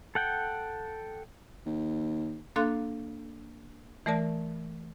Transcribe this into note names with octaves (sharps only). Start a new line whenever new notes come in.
A4 F#5 G5
D#2
A#3 D4 A4 F5 C6 F#6
E3 A3 A#4 D5 A5